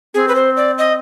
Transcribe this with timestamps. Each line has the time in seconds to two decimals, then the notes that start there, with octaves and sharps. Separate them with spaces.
0.14 C4 G#4
0.28 B4
0.35 C5
0.57 D5
0.78 D#5